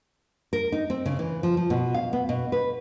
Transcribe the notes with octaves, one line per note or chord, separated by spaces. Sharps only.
A#4
D#4
C4
C#3
E3
F3
F3
B2
F5
B3
B2
B4